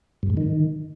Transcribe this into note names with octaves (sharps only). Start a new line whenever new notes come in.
G2
G#2
D#3